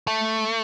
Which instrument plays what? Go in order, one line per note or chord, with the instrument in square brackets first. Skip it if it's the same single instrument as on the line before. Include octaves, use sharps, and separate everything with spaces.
[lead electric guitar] A3